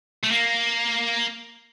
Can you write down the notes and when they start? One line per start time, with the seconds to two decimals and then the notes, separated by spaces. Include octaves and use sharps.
0.24 A3
0.32 A#3